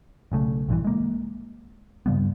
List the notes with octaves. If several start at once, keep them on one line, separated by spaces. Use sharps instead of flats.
B1 C#3 A3
A#1 G2 D3 E3
G#3 A#3
G2 C#3 G3 B3